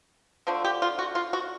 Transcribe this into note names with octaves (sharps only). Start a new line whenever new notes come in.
D3 F3 A3 D4
G4
F4
F#4
F4
F#4